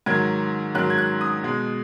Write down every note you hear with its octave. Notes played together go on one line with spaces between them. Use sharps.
G#2 D#3 F#3 G#6
G#2 D#3 F#3 F#6
G#6
F#6
D#6
B2 G#3